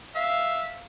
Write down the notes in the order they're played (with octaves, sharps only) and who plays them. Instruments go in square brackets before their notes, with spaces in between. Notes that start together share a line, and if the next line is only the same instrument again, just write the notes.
[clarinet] E5 [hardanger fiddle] F5